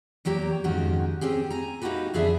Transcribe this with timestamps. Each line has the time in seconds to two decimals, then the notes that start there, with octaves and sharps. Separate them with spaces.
0.25 E2 F#3 A#3 G4 A#5
0.64 F2 G#2 D#3 C#4 F#4 G4
1.21 C4 C#4 G4 G#4
1.50 G#5 A#5
1.82 A#3 D#4 E4 F#4 G4 B4
2.14 F2 D3 B3 G#4 D5 E5